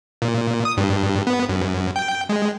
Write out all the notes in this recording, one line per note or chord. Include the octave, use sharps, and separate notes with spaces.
A#2
D#6
G2
B3
F#2
G5
G#3